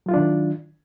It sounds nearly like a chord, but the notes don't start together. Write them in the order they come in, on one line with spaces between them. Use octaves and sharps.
F#3 F4 E4 D4 D#3